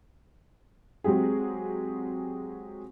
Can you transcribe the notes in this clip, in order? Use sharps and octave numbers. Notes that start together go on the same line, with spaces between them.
F#3 G#3 C4 G4 G#4